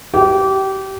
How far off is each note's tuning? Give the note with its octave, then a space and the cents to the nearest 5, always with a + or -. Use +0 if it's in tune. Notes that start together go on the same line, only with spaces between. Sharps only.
G4 -25